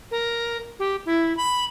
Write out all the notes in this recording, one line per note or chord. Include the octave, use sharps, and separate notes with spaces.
A#4
G4
E4
B5